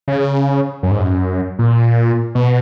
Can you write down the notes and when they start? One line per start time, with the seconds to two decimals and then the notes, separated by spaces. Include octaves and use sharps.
0.08 C#3
0.83 F#2
0.91 G#2
0.99 F#2
1.59 A#2
2.35 B2